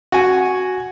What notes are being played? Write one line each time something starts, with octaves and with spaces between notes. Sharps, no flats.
F#4 G#5